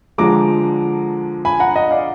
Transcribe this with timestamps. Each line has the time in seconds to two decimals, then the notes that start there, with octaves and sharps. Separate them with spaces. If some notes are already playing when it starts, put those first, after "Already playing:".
0.18 D3 F3 G#3 A#5 D6
1.45 G#5 B5
1.60 F#5 A#5
1.76 D#5 F#5
1.91 D5 F5